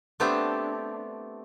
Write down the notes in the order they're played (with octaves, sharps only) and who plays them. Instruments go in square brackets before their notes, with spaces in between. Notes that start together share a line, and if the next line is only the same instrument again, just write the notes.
[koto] A3 B3 C4 D4 G4